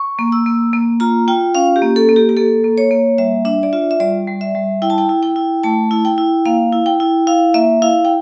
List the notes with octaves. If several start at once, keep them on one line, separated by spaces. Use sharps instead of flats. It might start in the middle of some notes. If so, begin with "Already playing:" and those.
Already playing: C#6
A#3
E6
A#3
A#3
F4 A#5
F4 G5
C#4 F5
G4
A#3
A4
A#3
G4
G4
A#3 A4
A#3
C#5
A#3
G3 E5
D4 E5
D5
F4 E5
E5
G3 D5
G3
E5
G3
E4 G5
A5
G5
E4
G5
E4
A3 A5
E4
G5
E4
A#3 F5
E4
G5
E4
E4 F5
A#3 E5
E4 F5
G5